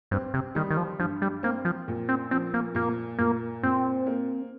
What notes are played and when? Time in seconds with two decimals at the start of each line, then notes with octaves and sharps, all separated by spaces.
0.11 G2 C4
0.34 C3
0.55 D#3 G3
0.70 D#3
0.77 F3
1.00 G2 F3
1.22 G3
1.43 A#3 C4
1.65 F3
1.88 A#2
2.09 C4
2.31 F3 C4
2.54 A#3
2.75 A#2 A#3
3.19 A#2 A#3
3.63 A#2 C4
4.06 A#3